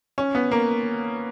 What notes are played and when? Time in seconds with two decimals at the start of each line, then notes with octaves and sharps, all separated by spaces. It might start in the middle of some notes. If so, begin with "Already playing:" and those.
0.18 C#4
0.35 B3
0.51 A#3